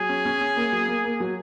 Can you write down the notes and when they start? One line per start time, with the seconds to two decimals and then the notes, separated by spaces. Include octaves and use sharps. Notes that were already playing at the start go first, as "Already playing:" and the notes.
Already playing: F#3 G#4
0.09 C#4
0.25 C#4
0.41 C#4
0.56 A#3
0.72 F#3
0.88 A#3
1.04 A#3
1.20 F#3